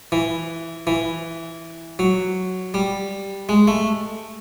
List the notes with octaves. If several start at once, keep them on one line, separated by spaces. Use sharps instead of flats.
E3
E3
F#3
G3
G#3
A3